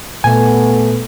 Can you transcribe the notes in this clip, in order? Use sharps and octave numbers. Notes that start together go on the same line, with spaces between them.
A#2 A3 B3 G#5